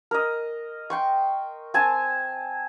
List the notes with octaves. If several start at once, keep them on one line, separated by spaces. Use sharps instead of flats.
A#4 D#5
G5 C6 C#6
C4 G#5 A5